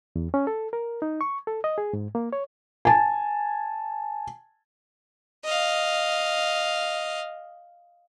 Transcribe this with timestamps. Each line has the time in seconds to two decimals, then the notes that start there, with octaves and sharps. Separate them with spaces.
0.16 E2
0.34 C#4
0.47 A4
0.73 A#4
1.02 D#4
1.21 C#6
1.47 A4
1.64 D#5
1.78 G#4
1.93 G#2
2.15 A#3
2.33 C#5
2.85 G#5 A5
5.45 D#5 F5